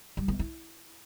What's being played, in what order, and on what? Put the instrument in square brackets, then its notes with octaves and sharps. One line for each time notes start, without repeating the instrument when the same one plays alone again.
[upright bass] G3
B3
E4